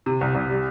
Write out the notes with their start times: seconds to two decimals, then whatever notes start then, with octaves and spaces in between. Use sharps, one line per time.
0.06 C3
0.21 C2
0.35 C2
0.50 G3